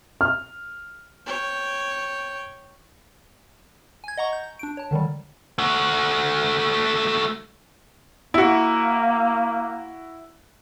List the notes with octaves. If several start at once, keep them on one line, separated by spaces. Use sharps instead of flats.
F6
C#5 G5
G#5 G#6
D#5 F#5 A#5 C#6
G6
D4 D7
C#5 A5
D3 D#3 F#3 G3
A3 F#4
A#3 E4 F#4